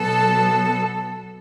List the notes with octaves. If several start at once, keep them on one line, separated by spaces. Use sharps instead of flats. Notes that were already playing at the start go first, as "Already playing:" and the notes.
Already playing: B2 F#3 B3 A4